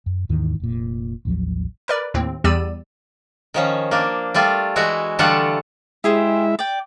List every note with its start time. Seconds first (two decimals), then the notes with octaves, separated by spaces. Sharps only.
0.06 F#2
0.29 D#2 G#2 D#3 E3
0.60 F1 A#2
1.25 A1 D#2 F3 F#3
1.88 A#4 B4 D5
2.14 D#2 A2 C4
2.44 E2 G3 G4 D5 E6 D#7
3.54 D#3 F3 C#4
3.91 A#3 D4
4.34 G3 A3 F4
4.76 E3 G#3 E4 F#4
5.19 D3 E3 G3 A3 F4 F#5
6.04 G#3 E4 G4 G#4 C5 E5
6.59 D5 G5